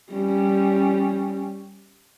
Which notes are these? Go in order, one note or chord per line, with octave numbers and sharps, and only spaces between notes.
G3 C#4